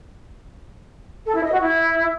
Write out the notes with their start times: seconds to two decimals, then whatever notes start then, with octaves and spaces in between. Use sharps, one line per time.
1.26 A4
1.34 E4
1.43 D#5
1.52 F#4
1.61 E4